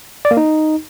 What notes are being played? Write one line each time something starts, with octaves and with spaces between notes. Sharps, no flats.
D5
A#3
D#4